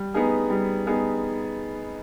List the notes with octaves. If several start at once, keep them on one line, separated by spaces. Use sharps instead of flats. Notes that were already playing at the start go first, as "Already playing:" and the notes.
Already playing: G3
B3 D#4 G#4
G3
B3 D#4 G#4